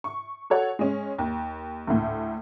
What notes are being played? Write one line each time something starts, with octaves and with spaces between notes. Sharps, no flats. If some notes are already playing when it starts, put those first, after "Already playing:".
C#6
F#4 A4 C#5 F#5
G#3 C#4
D#2
D2 A2